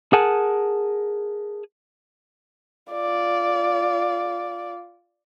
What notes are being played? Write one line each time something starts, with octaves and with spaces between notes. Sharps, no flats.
G#4 A#4 F#5 G#5 A5
F4 D5